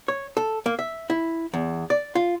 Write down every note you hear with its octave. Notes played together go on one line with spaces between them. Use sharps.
C#5
A4
A#3
E5
E4
E2
D5
F4